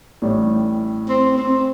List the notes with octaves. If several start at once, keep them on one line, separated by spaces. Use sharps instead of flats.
A1 A2 G3
C4
C4